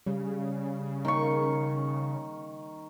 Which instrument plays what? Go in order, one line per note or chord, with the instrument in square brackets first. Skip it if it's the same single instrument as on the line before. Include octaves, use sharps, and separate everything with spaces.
[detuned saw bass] C#3 [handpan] G3
[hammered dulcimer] D#3 C#6 [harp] A#3